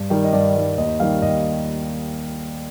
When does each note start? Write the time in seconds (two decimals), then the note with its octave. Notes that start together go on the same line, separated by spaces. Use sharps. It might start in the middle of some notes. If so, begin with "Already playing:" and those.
Already playing: G2
0.10 D#3 G3
0.24 D#5
0.33 G2 D5
0.56 D#3 G3
0.78 D#2 D#5
1.00 D#3 G3 F5
1.22 D#2 D#5